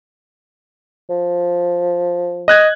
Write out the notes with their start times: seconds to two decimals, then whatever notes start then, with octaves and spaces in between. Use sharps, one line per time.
1.10 F3
2.48 D#5 F#6 G#6